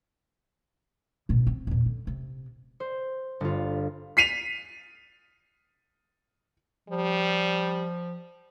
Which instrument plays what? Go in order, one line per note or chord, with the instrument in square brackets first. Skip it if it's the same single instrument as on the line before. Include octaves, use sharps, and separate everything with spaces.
[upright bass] A1 B2
C4
E2 A#2
D3
C3
[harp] C5
G1 F4
[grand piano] B6 C7 D#7 F7
[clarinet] F3 [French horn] G3